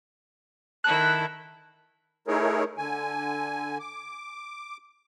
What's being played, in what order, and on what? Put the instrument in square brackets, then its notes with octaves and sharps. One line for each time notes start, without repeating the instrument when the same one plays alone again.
[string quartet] D#3 E4 A4 [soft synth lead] F#6
[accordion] A3 D#4 E4 G#4 A#4 C#5
D3 G#5
D6